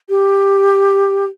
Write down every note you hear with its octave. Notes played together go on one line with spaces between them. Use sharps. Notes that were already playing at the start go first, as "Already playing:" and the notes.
G4